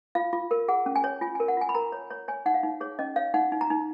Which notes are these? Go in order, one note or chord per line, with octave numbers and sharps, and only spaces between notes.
F4 F5
F4
A#4
G#4 F#5
C#4
G#5
C#5
F4 G#5
G#5
A#4
F#5
F4 G#5
B5
A#4 A#5
C#5
C#5
C#5 G#5
D#4 F#5
F5
D#4
G#4 C#5
C#4 D#5
C#5 F5
D#4 F#5
D#4
A#5
D#4